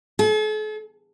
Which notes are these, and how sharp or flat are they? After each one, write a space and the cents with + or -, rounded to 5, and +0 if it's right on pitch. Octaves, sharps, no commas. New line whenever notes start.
A4 -45